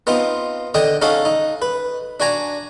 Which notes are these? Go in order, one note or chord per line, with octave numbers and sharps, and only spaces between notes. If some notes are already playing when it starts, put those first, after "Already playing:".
B3 C4 D#4 F4
D3 D#5 G5 D#6
C#4 D#4 A4 F5 F#5
D#4
B4
D4 F#4 G#5 A#5